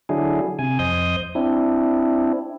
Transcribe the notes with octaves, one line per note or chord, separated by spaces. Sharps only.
D3 F#3 D4 E4 G#4
C3 G#5
F2 C5 D#5 D#6 G6
C4 D4 E4